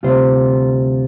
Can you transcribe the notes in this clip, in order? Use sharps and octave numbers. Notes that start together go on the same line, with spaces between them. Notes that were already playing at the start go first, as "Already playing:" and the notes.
D2 C3 G3 F4 C5